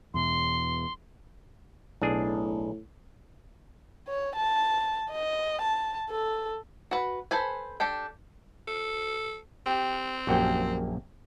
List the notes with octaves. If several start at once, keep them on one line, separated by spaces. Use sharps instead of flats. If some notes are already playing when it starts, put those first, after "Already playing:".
E2 B2 C6
B1 A2 D4 G#4
C#5
A5
D#5
A5
A4
F#4 B4
A4 B4 C5 G#5
D4 G4 A4 G5
A4
C4 G4
A#1 F#2 A#3 F#4 G4 C5